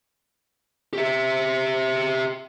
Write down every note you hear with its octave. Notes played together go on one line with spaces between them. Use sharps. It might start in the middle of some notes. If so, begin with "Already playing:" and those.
G4 E5